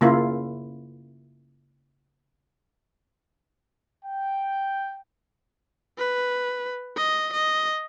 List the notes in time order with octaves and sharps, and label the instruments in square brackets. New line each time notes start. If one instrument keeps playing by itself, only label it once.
[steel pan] C#3 A#3 E4 F4
[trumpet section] G5
[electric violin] B4
D#5
D#5